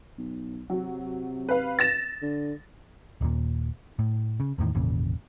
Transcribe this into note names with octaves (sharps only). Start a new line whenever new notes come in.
B1
C3 F#3
B4 F5
A6 A#6 E7
D3
D#1 D#2 A#2
A2
C#3
E2 A2 D#3
G#1 E2 A#2 C#3